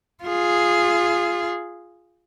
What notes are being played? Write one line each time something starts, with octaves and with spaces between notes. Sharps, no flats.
F4 G#4